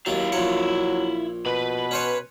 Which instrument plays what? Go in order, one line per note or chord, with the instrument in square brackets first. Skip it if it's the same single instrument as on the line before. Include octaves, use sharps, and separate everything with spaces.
[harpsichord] D#2 F#3 [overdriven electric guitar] E4 F5
[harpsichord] A#1 C#5 [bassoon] F#3
[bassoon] B2 [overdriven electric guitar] B4 B5
[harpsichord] C#4 C5 C#5